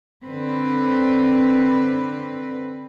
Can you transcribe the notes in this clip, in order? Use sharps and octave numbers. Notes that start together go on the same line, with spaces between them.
D3 C4 B4